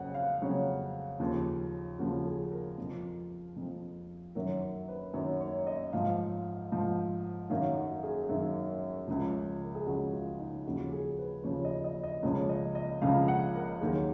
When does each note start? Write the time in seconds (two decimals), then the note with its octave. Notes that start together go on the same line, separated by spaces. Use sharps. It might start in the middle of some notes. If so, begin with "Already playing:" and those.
Already playing: F2 C#3 F#3 F#5
0.14 F5
0.42 F2 C#3 F#3 C#5
1.20 D#2 C#3 F3
1.99 D#2 C#3 F3 F#4
2.25 G#4
2.52 A#4
2.77 F2 F3
3.56 F2 F3
4.35 F#2 D#3 F#3 A#4
4.61 A#4
4.88 B4
5.14 F#2 D#3 F#3 C#5
5.41 C#5
5.67 D#5
5.93 G#2 F3 F5
6.71 G#2 F3
7.50 F#2 D#3 F#3 F5
7.77 F#4
8.03 G#4
8.29 F#2 D#3 F#3
9.08 C#2 C#3 F3
9.63 A#4
9.75 G#4
9.87 C#2 C#3 F3 F#4
10.12 F4
10.40 D#4
10.65 D#2 C#3 F3 F#4
10.92 G#4
11.18 B4
11.44 D#2 C#3 F3 C#5
11.65 D#5
11.84 D#5
12.03 D#5
12.23 C#2 C#3 F3 C#5
12.49 D#5
12.75 D#5
13.02 C#2 C#3 F3 F5
13.28 F#5
13.55 A#4
13.81 D#2 D#3 F#3 G#4